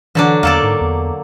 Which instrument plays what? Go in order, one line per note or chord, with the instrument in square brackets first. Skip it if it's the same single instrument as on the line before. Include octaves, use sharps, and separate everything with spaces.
[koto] D3 F#3 D4 [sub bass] E3
[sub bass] E2 [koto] A#3 A4 D5
[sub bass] G#2
E2